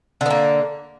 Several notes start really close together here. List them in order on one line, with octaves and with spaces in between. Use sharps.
D3 B3 A#3